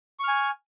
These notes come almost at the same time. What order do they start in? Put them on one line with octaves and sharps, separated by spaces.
C#6 F6 G#5